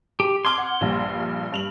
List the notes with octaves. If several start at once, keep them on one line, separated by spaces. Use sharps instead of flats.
G4
C6 D6 F6 G#6
F#5
A#1 G2 A#2
G2 F7 F#7